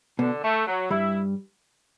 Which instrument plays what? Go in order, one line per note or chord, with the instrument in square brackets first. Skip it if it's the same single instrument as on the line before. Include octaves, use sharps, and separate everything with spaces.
[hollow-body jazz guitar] B2 B3 [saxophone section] D3
[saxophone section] A3
F#3
[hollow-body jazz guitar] G2 G3 [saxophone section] E4